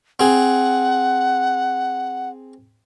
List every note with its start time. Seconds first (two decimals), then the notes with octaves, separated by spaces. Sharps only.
0.20 C4 G#4 F#5